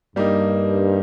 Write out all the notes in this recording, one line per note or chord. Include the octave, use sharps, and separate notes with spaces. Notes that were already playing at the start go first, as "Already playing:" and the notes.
G2 G3 A#3 D#4